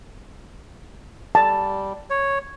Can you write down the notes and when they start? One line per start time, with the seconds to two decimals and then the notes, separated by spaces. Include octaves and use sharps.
1.35 G3 A5
2.10 C#5